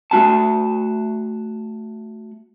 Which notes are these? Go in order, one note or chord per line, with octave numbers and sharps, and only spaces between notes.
A3 F#4 A5